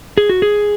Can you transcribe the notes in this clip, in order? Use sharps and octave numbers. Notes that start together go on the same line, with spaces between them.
G#4
F#4
G#4